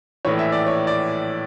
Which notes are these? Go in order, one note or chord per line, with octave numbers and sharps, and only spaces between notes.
A#1 A2 E3 C#5
E5
D5
C#5
D5